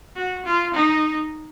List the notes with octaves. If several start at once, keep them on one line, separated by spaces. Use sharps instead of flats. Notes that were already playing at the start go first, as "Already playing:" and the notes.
F#4
F4
D#4